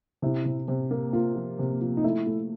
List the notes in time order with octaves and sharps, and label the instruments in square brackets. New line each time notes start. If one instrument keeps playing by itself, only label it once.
[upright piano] C3 [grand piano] E4
[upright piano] C3
C3
A#3
[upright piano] A#3 [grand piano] F4
[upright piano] F3
C3
F3
[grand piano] D#4
[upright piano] A3 [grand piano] E4
[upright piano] A3